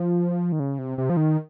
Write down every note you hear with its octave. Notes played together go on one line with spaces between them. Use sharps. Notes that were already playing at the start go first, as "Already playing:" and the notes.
Already playing: F3
D#3
C#3
C3
C3
F3
D#3